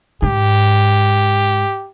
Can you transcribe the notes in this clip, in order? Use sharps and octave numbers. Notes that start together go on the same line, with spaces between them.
G#2 G4